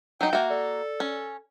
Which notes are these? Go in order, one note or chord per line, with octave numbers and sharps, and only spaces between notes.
F#3 D#4 G5
A#3 F#4 E5
A4 D5
C#4